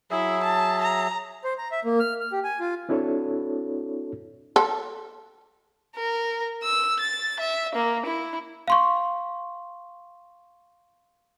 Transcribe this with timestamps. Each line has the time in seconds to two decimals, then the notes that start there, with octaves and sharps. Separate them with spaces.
0.11 F#3 E4 G#4 E5
0.43 A5
0.82 A#5
1.44 C5
1.58 A#5
1.72 E5
1.85 A#3
2.00 F6
2.21 F6
2.32 G4
2.44 G#5
2.60 F4
2.89 C4 D4 E4 F#4 A4 C#5
4.56 A4
5.96 A#4
6.63 E6
7.00 A6
7.40 E5
7.75 A#3
8.06 E4
8.68 F5 C6 C#6